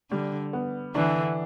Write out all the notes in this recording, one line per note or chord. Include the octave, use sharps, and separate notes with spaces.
D3 G3
B3
D3 E3 D4